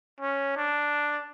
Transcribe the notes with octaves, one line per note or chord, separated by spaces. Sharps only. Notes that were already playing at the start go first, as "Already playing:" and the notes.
C#4
D4